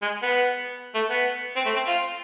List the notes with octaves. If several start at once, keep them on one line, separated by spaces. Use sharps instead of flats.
G#3
B3
A3
B3
C4
A3
C4
F4